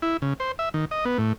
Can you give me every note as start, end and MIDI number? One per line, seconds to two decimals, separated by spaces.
0.02 0.17 64
0.22 0.34 49
0.40 0.52 72
0.59 0.69 76
0.74 0.85 51
0.91 1.05 75
1.05 1.18 59
1.18 1.33 45